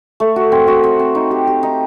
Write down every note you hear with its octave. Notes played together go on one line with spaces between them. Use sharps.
A3
F#4
C4
F#4
C4
C4
D#4
G4
G4
D#4